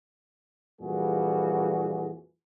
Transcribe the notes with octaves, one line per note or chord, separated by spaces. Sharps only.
F2 A#2 E3 G3 F#4 G#4